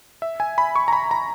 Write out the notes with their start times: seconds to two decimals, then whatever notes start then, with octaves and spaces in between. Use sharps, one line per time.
0.22 E5
0.40 G#5
0.58 B5
0.76 C#6
0.88 A#5
0.93 B5
1.11 A#5